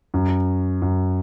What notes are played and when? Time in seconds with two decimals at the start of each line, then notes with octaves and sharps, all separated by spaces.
0.14 F#2
0.82 F#2